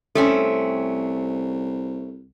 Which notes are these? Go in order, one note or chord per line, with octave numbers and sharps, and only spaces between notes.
C2 A3 C4 C#4 A4